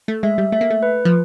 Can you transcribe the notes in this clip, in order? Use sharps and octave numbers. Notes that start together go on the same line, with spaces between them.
A3
G#3 E5
G3
A3 E5
A#3
A3
B4
F3